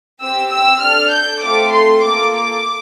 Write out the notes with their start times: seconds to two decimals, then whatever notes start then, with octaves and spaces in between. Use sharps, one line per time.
0.22 C4 G4 E6
0.53 E6
0.83 D4 A4 F6
1.13 G6
1.43 A3 C4 F4 A4 D6
1.73 C6
2.03 A#3 F4 A4 D6
2.34 D6